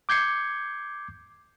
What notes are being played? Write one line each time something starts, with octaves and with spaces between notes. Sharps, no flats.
D6 G6 G#6 C7 C#7